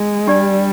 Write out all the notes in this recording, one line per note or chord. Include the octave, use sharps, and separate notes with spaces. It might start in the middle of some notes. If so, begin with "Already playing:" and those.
Already playing: G#3
G3 D4 G4 D5 G#5